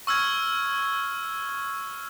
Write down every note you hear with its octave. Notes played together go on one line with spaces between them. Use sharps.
C#6 E6 F6 G#6